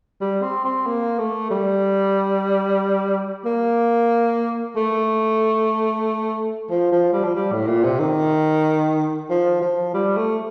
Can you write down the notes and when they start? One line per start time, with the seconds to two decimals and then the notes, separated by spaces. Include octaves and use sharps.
0.21 G3
0.43 C4
0.65 C4
0.87 A#3
1.19 A3
1.51 G3
3.45 A#3
4.76 A3
6.71 F3
6.92 F3
7.13 G3
7.25 F3
7.36 G3
7.52 A2
7.68 A#2
7.84 C3
7.99 D#3
9.30 F3
9.62 F3
9.94 G3
10.17 A3